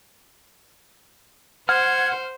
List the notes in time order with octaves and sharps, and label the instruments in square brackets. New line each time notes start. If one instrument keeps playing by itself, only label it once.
[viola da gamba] C5 [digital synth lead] F#5 [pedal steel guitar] F6 [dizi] G#6